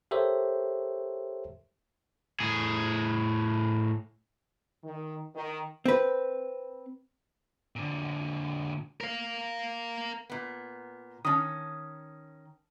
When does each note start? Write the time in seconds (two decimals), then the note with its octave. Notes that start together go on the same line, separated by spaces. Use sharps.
0.11 G4 A4 A#4 C5 C#5 E5
2.40 A2 G#4
4.83 D#3
5.35 D#3
5.86 C4 B4
7.76 A#2 D3
9.01 A#4 F5
10.30 A#2 B3
11.25 D#3 C#4 A5 D#6